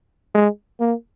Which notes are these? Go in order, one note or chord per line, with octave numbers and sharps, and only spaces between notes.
G#3
A#3